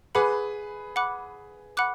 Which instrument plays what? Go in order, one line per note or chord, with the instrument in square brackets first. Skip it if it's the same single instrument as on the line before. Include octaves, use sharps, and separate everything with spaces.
[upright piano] G#4 B4 [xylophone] F#5 B5 D6 F#6
[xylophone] F#5 B5 D6 F#6
F#5 B5 D6 F#6